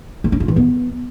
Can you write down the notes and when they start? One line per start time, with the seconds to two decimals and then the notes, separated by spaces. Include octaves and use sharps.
0.24 A3
0.32 C#4
0.40 F4
0.48 E3
0.56 B3